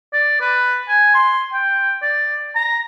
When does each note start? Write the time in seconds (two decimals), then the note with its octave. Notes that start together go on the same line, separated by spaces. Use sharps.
0.13 D5
0.41 B4
0.88 G#5
1.15 C6
1.53 G5
2.02 D5
2.55 A#5